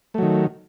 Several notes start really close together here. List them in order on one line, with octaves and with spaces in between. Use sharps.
A3 F#3 D#3